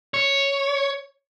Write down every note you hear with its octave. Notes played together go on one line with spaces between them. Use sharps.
C#5